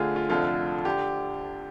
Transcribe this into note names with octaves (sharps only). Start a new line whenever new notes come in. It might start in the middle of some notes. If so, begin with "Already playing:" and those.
Already playing: D2 D3 F4 G#4
F4
F1 F2 D3 F4
D3 G4